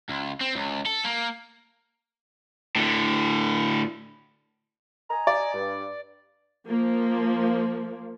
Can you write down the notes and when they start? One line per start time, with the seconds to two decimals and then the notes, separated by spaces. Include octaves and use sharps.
0.10 C#2
0.41 C4
0.56 C#2
0.86 A4
1.05 A#3
2.76 A2 D3
5.10 D#5 G#5 A#5
5.27 D5
5.54 G2
6.67 F3 A#3